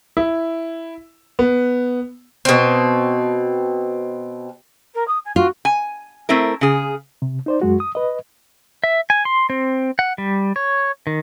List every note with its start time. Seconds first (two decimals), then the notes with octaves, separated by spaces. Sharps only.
0.17 E4
1.39 B3
2.45 B2 C4
4.94 A#4
5.07 D#6
5.24 G#5
5.36 F4 F#4
5.65 G#5
6.29 A3 C4 E4 A#4
6.61 C#3 G#4
7.22 C3
7.46 D#4 C5 D5
7.62 F#2 G#3 F#4
7.80 D#6
7.95 B4 D#5
8.84 E5
9.10 G#5
9.25 C6
9.50 C4
9.99 F#5
10.18 G3
10.56 C#5
11.07 D#3